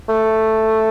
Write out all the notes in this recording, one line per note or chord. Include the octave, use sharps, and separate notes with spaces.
A3